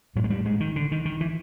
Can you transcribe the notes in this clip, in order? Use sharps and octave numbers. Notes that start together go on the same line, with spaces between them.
A2 F#3
G#3
G3
G#3
D#3
D3
D#3
D#3
E3